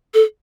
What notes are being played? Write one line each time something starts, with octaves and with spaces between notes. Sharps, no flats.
A4